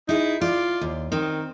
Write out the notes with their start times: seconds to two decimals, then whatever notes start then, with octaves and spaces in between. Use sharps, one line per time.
0.09 D#4 E4 G#4
0.41 F4 D5
0.81 D#2
1.12 D#3 C4